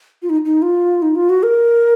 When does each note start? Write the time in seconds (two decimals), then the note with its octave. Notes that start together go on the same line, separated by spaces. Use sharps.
0.22 F4
0.30 D#4
0.45 D#4
0.62 F4
1.02 D#4
1.15 F4
1.29 F#4
1.43 A#4